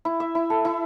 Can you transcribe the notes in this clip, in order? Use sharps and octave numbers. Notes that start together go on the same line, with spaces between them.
E4
E5
E4
A4
E4